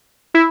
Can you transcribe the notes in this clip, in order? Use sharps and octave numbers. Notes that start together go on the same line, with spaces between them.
E4